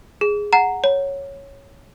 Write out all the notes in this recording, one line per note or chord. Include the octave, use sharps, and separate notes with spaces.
G#4
F#5 A#5
C#5